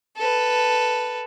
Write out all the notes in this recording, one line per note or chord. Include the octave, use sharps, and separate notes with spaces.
A4 B4